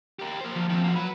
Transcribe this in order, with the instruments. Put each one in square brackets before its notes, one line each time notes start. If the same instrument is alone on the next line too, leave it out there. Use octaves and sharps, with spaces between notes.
[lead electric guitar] G4 A#4
A#3 C5
[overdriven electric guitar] F3
[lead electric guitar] D#3 C4
A#3 F#4
[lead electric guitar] F#3 [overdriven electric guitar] B4 B5